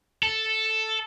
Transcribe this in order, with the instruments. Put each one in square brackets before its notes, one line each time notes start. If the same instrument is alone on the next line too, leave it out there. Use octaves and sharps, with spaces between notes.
[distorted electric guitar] A4